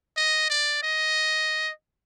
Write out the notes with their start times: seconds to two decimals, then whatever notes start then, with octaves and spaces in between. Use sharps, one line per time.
0.17 D#5
0.50 D5
0.83 D#5